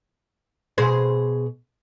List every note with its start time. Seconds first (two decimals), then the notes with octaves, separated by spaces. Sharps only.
0.78 B2 G#4 C5